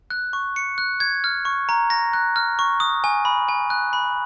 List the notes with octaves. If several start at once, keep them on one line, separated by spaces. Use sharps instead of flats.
F#6
C#6
C#7
F#6
G#6
F6
C#6
A#5
A#6
F#6
F6
C#6
D#6
G#5
B5
G#5
F#6
B5